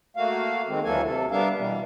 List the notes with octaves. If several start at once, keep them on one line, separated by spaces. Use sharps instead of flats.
A3 A#3 F#4 F5
D#3 G#3 C4
D2 E3 F#3 A#3 A4 G#5
C3 A4
G3 B3 D4 A#4 E5 F5
B2 E3 G3